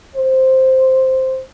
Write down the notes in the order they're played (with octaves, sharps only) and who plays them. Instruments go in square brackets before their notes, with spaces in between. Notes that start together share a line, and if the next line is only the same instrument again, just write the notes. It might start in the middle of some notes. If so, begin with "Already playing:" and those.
[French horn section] C5